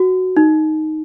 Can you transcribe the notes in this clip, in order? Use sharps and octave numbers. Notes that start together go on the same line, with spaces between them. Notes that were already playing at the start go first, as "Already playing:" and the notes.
Already playing: F#4
D#4